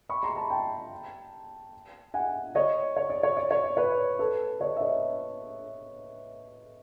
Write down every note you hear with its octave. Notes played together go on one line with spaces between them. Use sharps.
B5 C#6
A#5 C6
A5 B5
G5 A5
F#5 G#5
C#5 D#5
C#5
D5
C#5
D5
C#5
D5
B4 C#5
A4 B4
C#5 D#5
E5
C#5 D#5